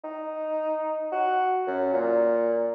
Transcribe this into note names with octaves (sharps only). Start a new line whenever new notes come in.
D#4
F#4
F#2
A#2